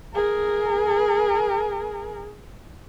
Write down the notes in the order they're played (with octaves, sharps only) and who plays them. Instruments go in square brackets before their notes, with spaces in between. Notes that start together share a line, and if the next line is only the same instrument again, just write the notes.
[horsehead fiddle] G#4 A#4